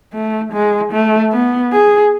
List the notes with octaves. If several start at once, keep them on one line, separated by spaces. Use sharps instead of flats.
A3
G#3
A3
B3
G#4